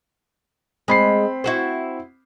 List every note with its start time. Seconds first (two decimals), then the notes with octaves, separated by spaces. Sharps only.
0.88 G#3 C4 B5 C7
1.44 E4 F#4 C5